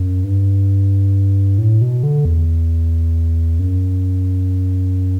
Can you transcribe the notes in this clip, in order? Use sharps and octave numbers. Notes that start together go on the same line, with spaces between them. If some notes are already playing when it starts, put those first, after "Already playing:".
Already playing: F#2
G2
A2
B2
D3
E2
F#2